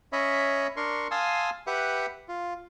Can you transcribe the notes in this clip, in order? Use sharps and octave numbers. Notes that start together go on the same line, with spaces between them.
C#4 C#5 D#5 E5 B5
D4 A#4 C6 C#6
F5 G#5 A5 C6 D#6 E6
G4 B4 E5 F#5
F4